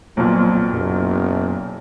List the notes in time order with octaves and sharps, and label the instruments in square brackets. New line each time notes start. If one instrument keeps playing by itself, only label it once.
[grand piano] B1 A#2 [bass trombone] F2 [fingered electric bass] F#3
[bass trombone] F#1 [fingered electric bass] F#2 B2